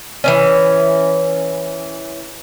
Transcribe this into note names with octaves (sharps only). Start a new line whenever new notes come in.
E3 B3 C#4